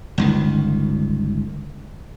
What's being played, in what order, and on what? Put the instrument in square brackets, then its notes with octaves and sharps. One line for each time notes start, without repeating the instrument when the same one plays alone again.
[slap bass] G1 C#2 D#3